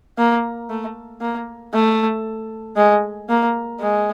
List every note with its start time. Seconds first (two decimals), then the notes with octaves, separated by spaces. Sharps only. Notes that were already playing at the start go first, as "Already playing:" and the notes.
0.18 A#3
0.70 A3
1.21 A#3
1.74 A3
2.77 G#3
3.29 A#3
3.81 G#3